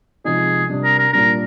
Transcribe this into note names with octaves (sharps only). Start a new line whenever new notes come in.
C3 F3 G#3 D#4 G#4
C3 G3 D4
A#4
A#4
A#2 G3 D4 A#4